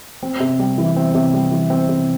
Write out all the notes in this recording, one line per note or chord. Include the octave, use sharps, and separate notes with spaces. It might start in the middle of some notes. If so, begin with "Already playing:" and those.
C4
C3
G3
E3
C4
C3
G3
E3
C4
C3